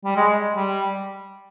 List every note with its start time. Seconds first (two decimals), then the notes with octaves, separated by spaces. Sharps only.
0.05 G3
0.16 G#3
0.56 G3